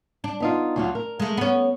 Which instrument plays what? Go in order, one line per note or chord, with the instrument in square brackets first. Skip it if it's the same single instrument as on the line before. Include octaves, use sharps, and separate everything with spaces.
[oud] D4
[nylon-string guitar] B3 D#4 F4
D2 F#3 F4
A#4
[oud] G#3 A3
B3 C#4